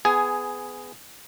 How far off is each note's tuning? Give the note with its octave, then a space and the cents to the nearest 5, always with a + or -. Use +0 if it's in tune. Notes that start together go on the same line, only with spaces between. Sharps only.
B3 +25 G#4 +0 G#5 +15